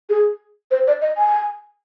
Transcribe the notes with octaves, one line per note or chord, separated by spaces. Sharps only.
G#4
C5
D5
D#5
G#5